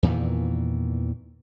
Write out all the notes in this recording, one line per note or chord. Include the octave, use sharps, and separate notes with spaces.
E2 A#2 D#3 E3